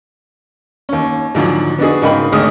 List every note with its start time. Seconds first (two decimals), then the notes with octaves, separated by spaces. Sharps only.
0.89 D#2 C#4
1.35 G#2 D3 F3 F#3
1.79 B3 D4 D#4 F#4 G#4
2.02 G#2 C#3 A#4 D#5 G5 B5
2.32 G#1 D3 G#3 A3 D#6 F6